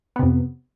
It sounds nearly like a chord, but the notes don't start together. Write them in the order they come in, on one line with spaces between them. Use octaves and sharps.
B3 C3 F2